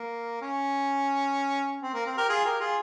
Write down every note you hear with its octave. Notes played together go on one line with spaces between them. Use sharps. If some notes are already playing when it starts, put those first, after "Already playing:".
Already playing: A#3
C#4
C4
A#3
C4
G4 A#4
F4 G#4
G4 A#4
F4 G#4